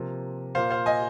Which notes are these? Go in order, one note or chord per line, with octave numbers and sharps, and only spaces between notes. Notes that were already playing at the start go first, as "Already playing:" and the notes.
Already playing: C3 F3 A#3
A#2 A#3 C5 F5
C5 F5
D#5 G#5